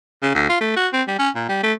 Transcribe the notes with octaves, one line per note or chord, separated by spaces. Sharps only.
C#3
D2
F4
A3
F#4
C4
G3
C#4
A#2
G3
A3